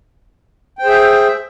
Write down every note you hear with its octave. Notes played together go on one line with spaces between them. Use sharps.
G#4 C5 E5 G5